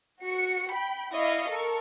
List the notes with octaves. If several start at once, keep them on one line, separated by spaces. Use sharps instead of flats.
F#4 C#7
G5 B5
E4 D5 D#5 F5 C#6
A4 A#4 C#6